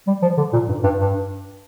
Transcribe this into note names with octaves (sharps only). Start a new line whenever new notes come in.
G3
F3
D3
A#2
G2
G2
G2